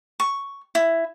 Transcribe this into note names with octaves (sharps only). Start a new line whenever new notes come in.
C#6
E4